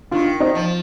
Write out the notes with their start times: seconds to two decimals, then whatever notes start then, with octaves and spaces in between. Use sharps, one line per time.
0.11 D#3 D4 F4
0.40 C4 D#4
0.55 F3